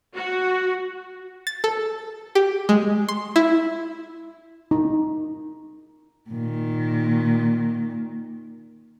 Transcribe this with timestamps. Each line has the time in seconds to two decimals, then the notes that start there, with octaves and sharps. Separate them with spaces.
0.15 F#4
1.47 A6
1.64 A4
2.35 G4
2.69 G#3
3.09 C6
3.36 E4
4.71 D#4
6.30 A#2 D#3